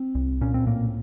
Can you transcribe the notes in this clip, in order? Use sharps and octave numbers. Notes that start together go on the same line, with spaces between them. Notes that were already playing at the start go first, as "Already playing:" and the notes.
Already playing: C4
C2
A#2 C#4
C4
A2 A#3